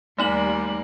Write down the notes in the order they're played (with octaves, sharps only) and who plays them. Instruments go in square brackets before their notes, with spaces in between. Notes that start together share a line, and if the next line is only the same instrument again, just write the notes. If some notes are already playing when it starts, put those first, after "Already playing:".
[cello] D#2 A#3 [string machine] G3 [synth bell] A3 D#4 F#7